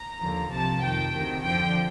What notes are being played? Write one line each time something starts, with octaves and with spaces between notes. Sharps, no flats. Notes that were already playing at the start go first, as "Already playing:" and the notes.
Already playing: A#5
D#2 D3 F3
C2 C3 F3 A5
F2 D#3 G5
D2 C3 D#3
F2 D3 F3 G5